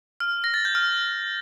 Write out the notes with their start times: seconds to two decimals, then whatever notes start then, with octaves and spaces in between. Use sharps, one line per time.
0.20 F6
0.44 A#6
0.54 A6
0.65 G6
0.75 F6